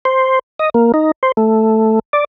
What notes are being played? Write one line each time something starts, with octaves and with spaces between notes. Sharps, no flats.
C5
D#5
A#3
D#4
C5
A3
D5